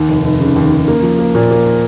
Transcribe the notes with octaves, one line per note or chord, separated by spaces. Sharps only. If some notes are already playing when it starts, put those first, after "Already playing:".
Already playing: D#2
F1
F1
C#3
D#2
C#3
A#3
F3
A#3
A#2
A#3